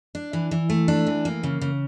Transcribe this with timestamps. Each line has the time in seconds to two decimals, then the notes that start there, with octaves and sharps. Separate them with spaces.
0.15 D4
0.33 E3
0.51 E3
0.70 A3
0.88 D4
1.07 E3
1.25 A#3
1.43 C#3
1.61 C#3